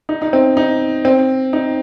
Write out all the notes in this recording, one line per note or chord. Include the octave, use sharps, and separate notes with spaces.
D#4
D#4
C4
D#4
C4
D#4